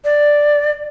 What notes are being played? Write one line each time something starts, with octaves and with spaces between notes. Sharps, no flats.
D5